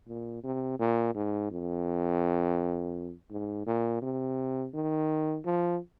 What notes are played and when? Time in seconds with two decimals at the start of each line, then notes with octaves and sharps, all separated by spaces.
0.08 A#2
0.44 C3
0.79 A#2
1.15 G#2
1.51 F2
3.31 G#2
3.66 A#2
4.02 C3
4.74 D#3
5.45 F3